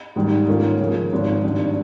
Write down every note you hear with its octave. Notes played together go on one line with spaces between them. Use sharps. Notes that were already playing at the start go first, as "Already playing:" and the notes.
G#2 D#3 G3
G#2 D#3 A#3 C#4 F4
C#3 F3 A#3
G#1 G#2 D#3
G#1 G2 D#3